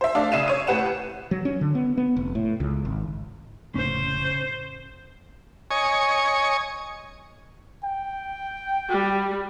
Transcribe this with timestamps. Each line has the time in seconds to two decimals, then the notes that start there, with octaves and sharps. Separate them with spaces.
0.01 C5 E5
0.15 A3 D4 D5 F5
0.32 C#3 E5 C7 D#7 E7
0.48 C#5 D#7
0.67 A2 G4 B4 F#5 E7
1.31 F#3
1.45 C#4
1.61 D3
1.75 B3
1.97 B3
2.16 F1
2.35 A2
2.60 C#2
2.85 G#1
3.75 F1 A2 C#3 C#4 C5
5.71 C#5 D#5 G#5 C#6
7.84 G5
8.89 G3